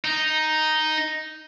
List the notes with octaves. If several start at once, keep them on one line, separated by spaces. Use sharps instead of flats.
D#4